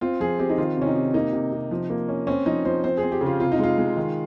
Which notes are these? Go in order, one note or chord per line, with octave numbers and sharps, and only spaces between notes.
C4 F4
F3 G#4
C4 G4
D#4
D#3 F4
C3 C#4
D#4
C3
A#3 D#4
C3
C3
F3
A#3
C#4
C4 C#4
F3 D#4
F3 C5
C4 C5
G#4
C4
G4
C#3
F4
C3 F4
D#4
G#3 F4
G#3
D#3